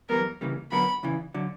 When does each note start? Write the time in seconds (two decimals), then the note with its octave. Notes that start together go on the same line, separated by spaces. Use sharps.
0.09 F#2 E3 G3 B3 A#4
0.41 C#2 C#3 E3 G3 A#3
0.71 D3 F#3 B3 F#4 A#4 B5
1.03 E2 C#3 E3
1.34 D3 F#3